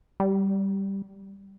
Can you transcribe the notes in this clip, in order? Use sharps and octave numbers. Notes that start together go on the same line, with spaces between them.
G3